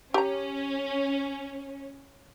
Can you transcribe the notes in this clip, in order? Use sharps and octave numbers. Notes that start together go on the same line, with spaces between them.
C#4 G4 A#5